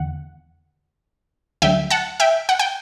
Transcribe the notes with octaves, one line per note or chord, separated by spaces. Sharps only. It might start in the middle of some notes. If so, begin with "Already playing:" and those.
Already playing: E2 D3 F#5
D2 D3 F#3 E5 G5
F#5 A5
E5 G5
F#5
G5